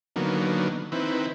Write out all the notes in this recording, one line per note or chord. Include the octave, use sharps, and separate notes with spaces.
D3 D#3 F#3 A#3 B3
D#3 C4 E4 B4